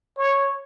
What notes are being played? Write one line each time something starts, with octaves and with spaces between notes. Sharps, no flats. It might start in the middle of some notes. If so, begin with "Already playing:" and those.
C#5